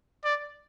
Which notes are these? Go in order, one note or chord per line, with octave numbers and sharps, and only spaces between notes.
D5